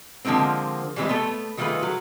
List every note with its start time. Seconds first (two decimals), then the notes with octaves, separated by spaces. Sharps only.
0.25 D3 F3 G#3 A#3 C4
0.96 E3 G3 G#3 C4 B4 D#5
1.09 A3 B3
1.57 D#3 G3 A3 F4 G#4 B4
1.83 F#3